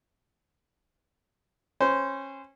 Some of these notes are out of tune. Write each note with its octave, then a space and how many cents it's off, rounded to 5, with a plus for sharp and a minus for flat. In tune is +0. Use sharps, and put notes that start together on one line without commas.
C#4 -25 C5 -20